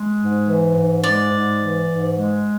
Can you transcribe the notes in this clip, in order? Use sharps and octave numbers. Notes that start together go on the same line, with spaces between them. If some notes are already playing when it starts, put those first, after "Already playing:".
Already playing: G#3
G#2
E3
G#2
G#3 D5
G#2
E3
G#2
G#3